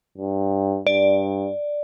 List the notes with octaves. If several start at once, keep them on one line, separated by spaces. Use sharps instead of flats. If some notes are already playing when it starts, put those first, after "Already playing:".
G2
G2 D5